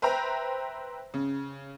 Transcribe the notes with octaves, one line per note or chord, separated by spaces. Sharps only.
B4 C5 E5 G5 A#5
C#3